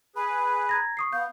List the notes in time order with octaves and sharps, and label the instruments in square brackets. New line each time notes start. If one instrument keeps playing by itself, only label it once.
[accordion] G#4 B4 [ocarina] B5
[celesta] A#5 G#6 A#6
C#6 D#6 C7
[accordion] B3 [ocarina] F5 [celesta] G6